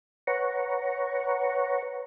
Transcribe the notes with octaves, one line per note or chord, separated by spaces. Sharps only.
B4 C#5 F#5 A#5 C#6